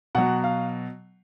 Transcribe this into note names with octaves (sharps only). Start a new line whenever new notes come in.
B2 F#3 F#5
F5